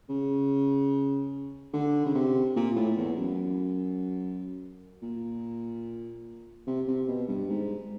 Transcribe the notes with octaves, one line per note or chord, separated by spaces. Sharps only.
C#3
D3
C#3
C3
A#2
A2
E2
F#2
A#2
C3
C3
B2
G2
G#2